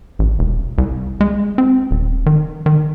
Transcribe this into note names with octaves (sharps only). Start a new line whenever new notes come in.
A1
E1
C2
G#3
C4
D#1
D#3
D#3